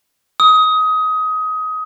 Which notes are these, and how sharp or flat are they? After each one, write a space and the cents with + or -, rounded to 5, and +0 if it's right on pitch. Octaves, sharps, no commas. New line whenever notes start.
D#6 +20